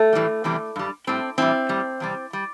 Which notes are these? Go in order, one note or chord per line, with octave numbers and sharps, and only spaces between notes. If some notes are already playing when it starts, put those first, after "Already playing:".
Already playing: A3
A2 E3 G3
E2 C3 E3 G3
G2 G3
A2 G3 C4
A2 E3 G3 C4 E4
A2 G3
E2 C3 G3
G3